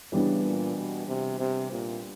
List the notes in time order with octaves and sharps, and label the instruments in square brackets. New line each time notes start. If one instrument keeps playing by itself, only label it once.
[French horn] C#3 [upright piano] E3 G3 B3 D4
[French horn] A#2
B2
C3
C3
A#2